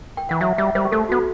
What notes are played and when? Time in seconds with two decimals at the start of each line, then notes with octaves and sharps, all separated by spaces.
0.17 G5
0.29 E3 F#5
0.41 F#3 E5
0.58 G3 E5
0.75 G3 C5
0.85 G4
0.92 A3 A4
1.09 B3 F#4